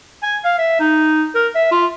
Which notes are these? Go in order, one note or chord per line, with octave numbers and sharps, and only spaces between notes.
G#5
F5
E5
D#4
A#4
E5
F4